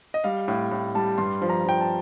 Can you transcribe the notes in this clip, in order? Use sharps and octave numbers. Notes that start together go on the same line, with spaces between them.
D#5
G3 F5
A2 F5
A2
G3 A5
G2 C6
F3
A#5
F3 G5
A5